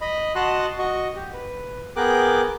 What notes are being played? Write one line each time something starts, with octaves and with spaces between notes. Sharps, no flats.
D#5 B5
F#4 D#5 F#5 A5 C6 F#6
F#4 D#5 C#6
G4
B4
B3 G#4 A#4 G5 D6 F#6